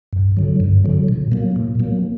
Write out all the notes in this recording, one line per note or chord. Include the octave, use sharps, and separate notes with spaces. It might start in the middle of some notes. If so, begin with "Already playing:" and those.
G2
D3 F#3
G2
D3 F#3
A#2
F#3 A#3
A#2
F#3 A#3